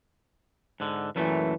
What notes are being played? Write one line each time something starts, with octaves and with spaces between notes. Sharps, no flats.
G#2 D3
F#2 A#2 E3 A3